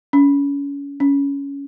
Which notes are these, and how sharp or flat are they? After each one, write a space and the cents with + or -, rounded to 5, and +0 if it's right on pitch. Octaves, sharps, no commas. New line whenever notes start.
C#4 +30
C#4 +15